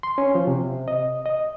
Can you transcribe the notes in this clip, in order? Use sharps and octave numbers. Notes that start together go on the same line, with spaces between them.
C6
C#4
F3
C3
D#5
D#5